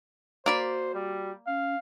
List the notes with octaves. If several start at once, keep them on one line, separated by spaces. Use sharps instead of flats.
A#3 F#4 C5 D5 B5
G3
C#4 F5